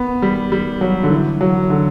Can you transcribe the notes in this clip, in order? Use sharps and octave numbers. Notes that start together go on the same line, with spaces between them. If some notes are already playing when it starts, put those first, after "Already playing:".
Already playing: B3
G3
G3
F#3
D3
E3
F#3
D3